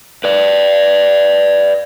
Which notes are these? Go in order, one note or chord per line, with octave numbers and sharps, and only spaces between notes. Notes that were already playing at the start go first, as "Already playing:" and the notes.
B4 D5